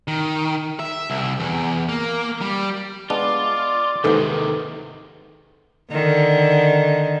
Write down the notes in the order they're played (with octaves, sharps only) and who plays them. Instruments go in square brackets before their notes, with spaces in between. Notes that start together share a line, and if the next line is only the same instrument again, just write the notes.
[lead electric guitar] D#3
E5
C2
E2
A#3
G3
[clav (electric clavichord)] G#3 B3 D4 [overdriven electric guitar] F4 [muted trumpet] D5
[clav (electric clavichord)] D#2 G#2 E3 [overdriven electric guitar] C3 D#3 [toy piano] A4 B4 F#5
[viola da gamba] D3 D#3